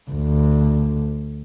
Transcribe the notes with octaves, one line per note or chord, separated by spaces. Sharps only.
D2